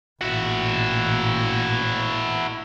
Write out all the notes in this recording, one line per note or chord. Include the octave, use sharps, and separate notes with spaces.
A1 A#2 E4 F#4